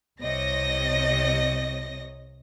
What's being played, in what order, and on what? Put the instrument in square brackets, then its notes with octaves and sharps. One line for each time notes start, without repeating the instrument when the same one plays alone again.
[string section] C2 C3 C#5 D#5 A#6